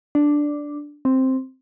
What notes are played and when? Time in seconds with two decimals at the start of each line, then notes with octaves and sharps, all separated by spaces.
0.15 D4
1.05 C4